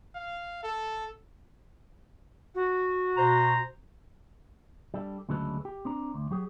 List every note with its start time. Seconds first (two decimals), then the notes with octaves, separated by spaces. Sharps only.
0.15 F5
0.64 A4
2.55 F#4
3.17 B2 C5 A#5
4.94 G3 D4 A4
5.29 D2 C#3 F#3 G#3 A4 B4
5.65 G4
5.85 C4 D4 A#5
6.14 D2
6.31 F#3 G4 G#4